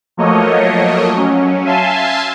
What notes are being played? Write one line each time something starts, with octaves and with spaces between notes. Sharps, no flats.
F3 F#3 A3 A#3 C#5 D#5
F#3 C#4
E5 F5 G#5 A5 C6